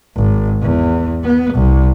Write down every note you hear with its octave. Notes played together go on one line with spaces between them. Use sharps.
G#1
E2
B3
C2